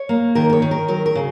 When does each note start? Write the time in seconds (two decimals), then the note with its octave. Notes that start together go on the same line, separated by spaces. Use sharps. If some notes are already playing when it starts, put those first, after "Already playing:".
Already playing: C#5
0.09 A#3
0.35 D#3 A#4
0.50 A#4
0.53 C#5
0.62 D#3
0.71 A#4
0.88 F#3 A#4
1.06 A#4
1.15 C#3